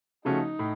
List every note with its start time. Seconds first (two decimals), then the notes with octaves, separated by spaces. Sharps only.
0.25 C#3 F3 A3 C#4 D#4 F#4
0.59 A2